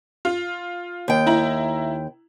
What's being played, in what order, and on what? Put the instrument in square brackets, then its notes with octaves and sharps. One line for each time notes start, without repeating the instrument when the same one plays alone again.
[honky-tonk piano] F4
[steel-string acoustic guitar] D#2 G5
[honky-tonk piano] E4 A#5 F#7